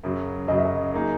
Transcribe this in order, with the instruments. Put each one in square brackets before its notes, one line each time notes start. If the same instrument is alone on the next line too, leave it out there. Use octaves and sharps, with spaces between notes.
[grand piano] F#2 C#3 F#3
[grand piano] F#2 C#3 F#3 [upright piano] D#5
[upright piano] E5
D#5
[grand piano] A#3 D#4 G#4